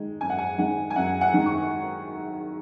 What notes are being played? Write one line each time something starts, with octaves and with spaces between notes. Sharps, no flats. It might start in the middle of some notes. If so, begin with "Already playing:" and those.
Already playing: D#3 G#3
F#2 G#5
F#5
G#5
D#3 G#3 F#5
G#5
F#2 F#5
F#5
D#3 G#3
C#6